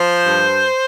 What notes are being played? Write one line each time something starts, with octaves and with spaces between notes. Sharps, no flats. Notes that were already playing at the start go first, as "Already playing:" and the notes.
Already playing: F3 C5
G2